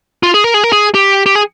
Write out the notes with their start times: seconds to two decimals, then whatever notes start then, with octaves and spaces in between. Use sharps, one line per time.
0.23 F4
0.34 G#4
0.44 A#4
0.54 G#4
0.64 A#4
0.72 G#4
0.95 G4
1.26 G4
1.35 G#4